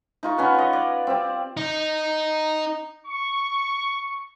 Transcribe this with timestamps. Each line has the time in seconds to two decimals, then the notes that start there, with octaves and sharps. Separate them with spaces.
0.23 D#4 F4 C#6
0.38 B3 C#4 B4
0.55 C#5 D#5
0.73 D5
1.07 C4 G4
1.57 D#4
3.06 C#6